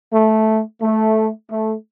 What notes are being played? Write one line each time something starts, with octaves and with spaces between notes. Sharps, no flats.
A3
A3
A3